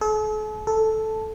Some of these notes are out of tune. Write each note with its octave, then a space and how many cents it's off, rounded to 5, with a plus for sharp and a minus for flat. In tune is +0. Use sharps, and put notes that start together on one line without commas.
A4 -45
A4 -5